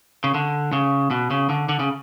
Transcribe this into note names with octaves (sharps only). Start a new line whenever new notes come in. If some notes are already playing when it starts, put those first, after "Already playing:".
C#3
D3
C#3
B2
C#3
D3
D3
C#3